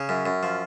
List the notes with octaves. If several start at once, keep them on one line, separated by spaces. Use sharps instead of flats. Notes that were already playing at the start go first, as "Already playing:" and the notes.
Already playing: C#3 C#5
F#2
F#2
F3